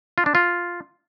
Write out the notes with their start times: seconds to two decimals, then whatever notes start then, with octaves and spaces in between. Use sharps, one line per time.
0.18 F4
0.26 D4
0.35 F4